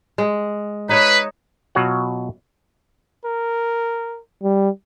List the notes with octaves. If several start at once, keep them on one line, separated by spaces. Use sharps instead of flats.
G#3
D#4 B4 C#5 E5
B2 F#3 F4 F#4 C#5 F#5
A#4
G3